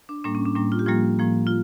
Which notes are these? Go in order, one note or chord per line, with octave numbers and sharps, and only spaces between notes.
D4
A2 G3 A#3 D4
C#4
D4
A2 G3 A#3 D4
F4
G4
A2 F3 G3 A#3 F4
A2 F3 A#3
F4